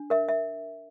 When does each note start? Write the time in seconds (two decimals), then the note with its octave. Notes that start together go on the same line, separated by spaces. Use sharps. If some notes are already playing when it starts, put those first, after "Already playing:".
Already playing: D4
0.10 A#4 E5
0.29 E5